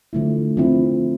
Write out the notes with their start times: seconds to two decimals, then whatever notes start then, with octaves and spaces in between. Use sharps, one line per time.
0.13 D3 F3 A3 E4
0.57 F3 C4 E4